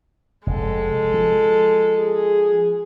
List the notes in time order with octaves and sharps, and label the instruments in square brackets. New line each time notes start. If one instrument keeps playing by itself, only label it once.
[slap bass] F1 [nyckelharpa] G#3 A4
[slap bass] F3
[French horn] G#4